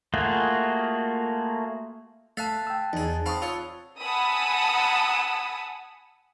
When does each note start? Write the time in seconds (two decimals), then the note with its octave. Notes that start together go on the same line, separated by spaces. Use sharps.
0.14 A3 A#3 F4 F#4 G#4
2.37 A3 E5 F5 A5 F#6 A6
2.67 G5 E6
2.93 E2 D#4 G#4
3.26 C4 F5 A5 B5 C#6 D#6
3.42 F4 C#5 E6
4.01 F#5 G#5 A5 B5 D#6 E6